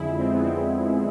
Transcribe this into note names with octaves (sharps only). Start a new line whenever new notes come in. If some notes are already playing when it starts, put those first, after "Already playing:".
Already playing: F2 D3 F3 G#3 E4 G#4
C4
B3
C4